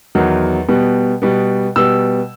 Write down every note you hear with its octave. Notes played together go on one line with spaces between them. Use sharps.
E2 D#3 F#3
B2 G3 B3
B2 G3 B3
B2 G3 B3 E6